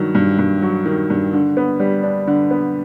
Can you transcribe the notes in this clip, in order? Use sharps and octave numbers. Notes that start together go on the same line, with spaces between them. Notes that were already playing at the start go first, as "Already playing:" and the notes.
Already playing: G2 D#3 F#3
G2
G2
F#3
D#3
G2
D3
B3
G3
D4
D3
B3